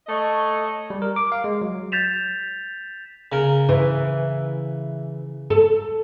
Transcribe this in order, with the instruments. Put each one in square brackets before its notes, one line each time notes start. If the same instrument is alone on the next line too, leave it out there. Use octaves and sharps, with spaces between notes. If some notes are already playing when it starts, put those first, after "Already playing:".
[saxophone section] A3 C#5 D#5
[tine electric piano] G3
A#4
D6
F5
G#3
F#3
[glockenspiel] G6 A6 B6 E7 F7
[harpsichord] C#3 A#4
[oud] E3
A4